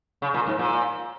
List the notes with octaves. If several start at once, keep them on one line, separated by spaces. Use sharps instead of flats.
C#3
A#2
G#2
A#2